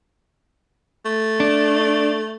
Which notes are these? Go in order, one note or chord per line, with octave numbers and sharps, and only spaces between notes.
A3
D4